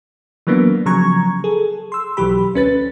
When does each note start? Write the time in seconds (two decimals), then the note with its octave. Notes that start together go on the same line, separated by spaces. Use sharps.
0.47 E3 F#3 A#3 B3 D4
0.86 C#3 F3 F#3 A#5 C#6 G#6
1.44 G#4 A4
1.92 C6 E6
2.17 B1 E3 F#3 G4 B5
2.54 D2 C#4 B4 A6